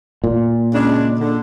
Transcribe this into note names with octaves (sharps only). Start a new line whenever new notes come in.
A#2
C#3 G#3 D4
D3